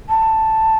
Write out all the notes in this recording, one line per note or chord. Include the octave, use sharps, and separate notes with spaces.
A5